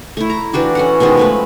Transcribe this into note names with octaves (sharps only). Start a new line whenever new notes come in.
A3 E4
A#5
E3 D4 F#4 G4
C#4 A4 F#5
B2 D#3 F3 G#3
G#3 A3 B4